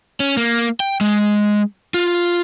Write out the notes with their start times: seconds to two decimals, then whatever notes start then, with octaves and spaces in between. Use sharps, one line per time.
0.20 C#4
0.37 A#3
0.80 G5
1.01 G#3
1.94 F4